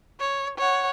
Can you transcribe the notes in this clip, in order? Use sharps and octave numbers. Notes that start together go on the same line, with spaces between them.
C#5
C#5 F#5